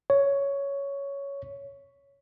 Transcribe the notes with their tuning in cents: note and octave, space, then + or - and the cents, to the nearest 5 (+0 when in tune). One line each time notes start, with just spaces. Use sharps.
C#5 +10